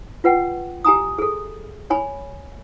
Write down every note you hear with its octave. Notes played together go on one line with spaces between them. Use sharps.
F4 B4 F#5 G5
G4 G#5 A#5 D#6
G#4 A4
C#5 G#5 B5